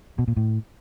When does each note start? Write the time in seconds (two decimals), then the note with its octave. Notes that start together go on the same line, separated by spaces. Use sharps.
0.19 B2
0.28 A#2
0.37 A2